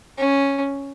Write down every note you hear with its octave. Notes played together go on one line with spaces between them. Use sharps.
C#4